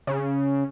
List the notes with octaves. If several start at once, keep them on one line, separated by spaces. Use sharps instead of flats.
C#3